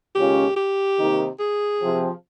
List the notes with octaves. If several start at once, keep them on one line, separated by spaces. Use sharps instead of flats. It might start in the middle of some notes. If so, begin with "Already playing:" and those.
D#2 C#3 G#3 C#4 F4 G4
G4
C3 D#3 A#3 D#4
G#4
C3 F3 C4